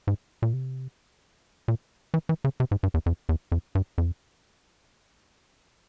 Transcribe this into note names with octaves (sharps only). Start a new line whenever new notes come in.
G#2
A#2
C3
A#2
E3
E3
C#3
C3
G#2
G2
E2
F2
E2
F2
G2
F2